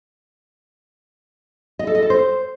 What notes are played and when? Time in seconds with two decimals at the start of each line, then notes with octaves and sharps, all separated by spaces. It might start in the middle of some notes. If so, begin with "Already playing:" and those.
1.79 D#5
1.87 A4
1.95 D#5
2.02 A4
2.10 C5